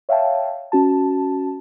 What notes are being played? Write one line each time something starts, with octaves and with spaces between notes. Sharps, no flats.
C#5 E5 F5 G5 A5
C#4 F#4 A5